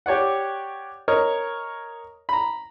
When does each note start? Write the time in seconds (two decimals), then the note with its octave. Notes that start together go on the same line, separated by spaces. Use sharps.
0.06 G4 C#5 D5 F#5
1.08 A#4 C#5 D#5
2.29 A#5 B5